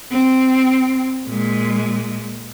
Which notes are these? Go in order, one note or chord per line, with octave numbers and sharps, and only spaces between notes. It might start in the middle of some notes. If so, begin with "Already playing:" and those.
C4
A#2 G#3